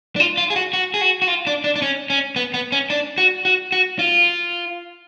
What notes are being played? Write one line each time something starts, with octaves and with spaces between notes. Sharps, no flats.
D4
F4
F4
G#4
F#4
F#4
G#4
F#4
F#4
F4
D4
D4
D4
C#4
C#4
B3
B3
C#4
D4
F#4
F#4
F#4
F4